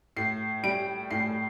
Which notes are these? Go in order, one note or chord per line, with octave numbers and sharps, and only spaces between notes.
A2 C7
G3 D7
A2 C7